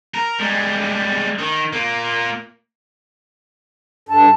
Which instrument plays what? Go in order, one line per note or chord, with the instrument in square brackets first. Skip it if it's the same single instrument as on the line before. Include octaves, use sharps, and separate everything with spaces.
[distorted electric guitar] A#4
G3 G#3
D#3
A#2 A#3
[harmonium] G2 A4 [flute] A5